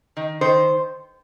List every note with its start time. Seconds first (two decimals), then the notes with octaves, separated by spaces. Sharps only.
0.17 D#3
0.41 D#3 C5